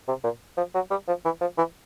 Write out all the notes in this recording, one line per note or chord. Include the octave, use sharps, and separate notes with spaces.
C3
A#2
F3
F#3
G3
F3
E3
F3
E3